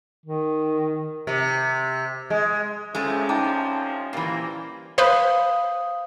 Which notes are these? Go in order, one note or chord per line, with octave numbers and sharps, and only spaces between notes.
D#3
C3
G#3
C2 C3 F3 G#3 A3 C#4 E4
D#4 G5 A5 D6
A#2 E3 G3 A#3 C5
B4 C5 F5 B5 D#6